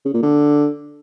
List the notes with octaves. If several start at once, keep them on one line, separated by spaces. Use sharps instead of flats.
C#3
A#2
D3